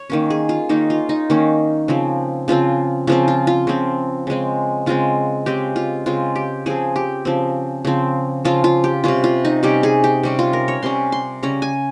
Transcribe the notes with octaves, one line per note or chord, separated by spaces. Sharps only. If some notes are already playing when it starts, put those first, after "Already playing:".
Already playing: C#5
D#3 A#3 C#4
G#4
F4
D#3 A#3 C#4 D#4
F4
D#4
D#3 A#3 C#4
C#3 F3 C4
C#3 F3 C4 F4
C#3 F3 C4 F4
F4
F4
C#3 F3 C4
C#3 G#3 C4
C#3 G#3 C4 F4
C#3 G#3 C4 G4
F4
C#3 G#3 C4 F4
G4
C#3 F3 C4 G#4
G4
C#3 F3 C4
C#3 F3 C4
C#3 F3 C4 F4
F4
G4
C3 G3 C#4 F4
F4
D#4
C3 G3 C#4 G4
G#4
G4
C3 G3 C#4
F4
A#4
C#5
C3 G3 C#4 C6
C6
C#3 G3 C#4 A#5
G#5